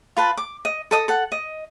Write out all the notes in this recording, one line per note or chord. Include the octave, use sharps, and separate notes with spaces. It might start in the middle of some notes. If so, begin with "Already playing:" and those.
F4 B4 A5
D6
D#5
A4 D#5 D#6
A4 F#5
D#5